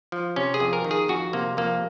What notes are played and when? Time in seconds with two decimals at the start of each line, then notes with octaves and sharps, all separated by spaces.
0.12 F3
0.36 C3 C#4
0.54 G#4
0.60 F2
0.73 A#4
0.85 D#3
0.91 G#4
1.08 F2 F#4
1.33 C3 A#3
1.57 F2 A#3